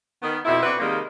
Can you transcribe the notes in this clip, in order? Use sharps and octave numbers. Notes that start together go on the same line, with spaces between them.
D#3 B3
F2 B2 E4
C4 D4 F#4 B4
C3 D#3 G3 G#3 A#3